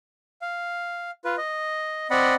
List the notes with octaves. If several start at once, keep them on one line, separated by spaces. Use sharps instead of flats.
F5
F4 B4
D#5
C4 D5 D#5 F#5 B5